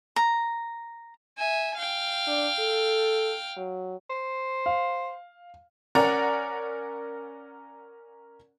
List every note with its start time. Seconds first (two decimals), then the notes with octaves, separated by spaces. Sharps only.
0.16 A#5
1.38 E5 G#5
1.77 F5 G5
2.27 D4
2.59 A4
3.57 F#3
4.10 C5
4.66 F5
5.95 C#4 A#4 D5 F#5 A#5